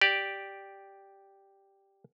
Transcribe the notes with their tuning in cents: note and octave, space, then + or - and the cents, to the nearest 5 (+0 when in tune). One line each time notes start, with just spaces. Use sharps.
G4 +0 D5 +0